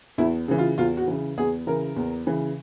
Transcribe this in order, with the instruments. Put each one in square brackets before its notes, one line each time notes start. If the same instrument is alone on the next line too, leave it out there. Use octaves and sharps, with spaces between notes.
[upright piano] E2 E4
C#3 E3
F4
E2 F4
F#4
C#3 E3
E2 G#4
C#3 E3 A#4
E2
C#3 E3